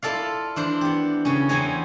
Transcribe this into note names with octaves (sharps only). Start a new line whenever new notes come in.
E4 F4 A4 D5 F5
E3 D4 C5
B3 G4
C#3 C#4
E2 E3 C4 C#4 G#5 A#5